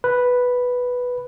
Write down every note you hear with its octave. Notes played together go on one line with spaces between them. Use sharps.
B4